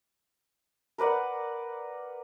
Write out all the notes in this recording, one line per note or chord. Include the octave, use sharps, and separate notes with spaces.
A#4 B4 D5 F#5